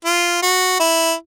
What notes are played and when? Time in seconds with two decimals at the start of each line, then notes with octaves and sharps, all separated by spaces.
0.05 F4
0.42 F#4
0.80 E4